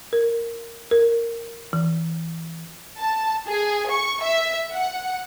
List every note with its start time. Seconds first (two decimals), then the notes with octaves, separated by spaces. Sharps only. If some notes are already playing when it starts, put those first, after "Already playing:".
0.13 A#4
0.91 A#4
1.73 E3
2.99 A5
3.47 G#4
3.90 C#6
4.22 E5
4.73 F#5